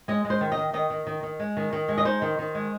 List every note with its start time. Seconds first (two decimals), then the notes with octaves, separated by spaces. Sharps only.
0.08 G#3 D#5
0.25 G#3
0.30 C5
0.41 D#3
0.52 D#5
0.57 D#3
0.73 D#3 D#5
0.90 D#3
1.07 D#3
1.23 D#3
1.39 G#3
1.57 D#3
1.73 D#3
1.89 G#3
1.98 D#5
2.05 D#4 C5
2.22 D#3
2.39 D#3
2.55 G#3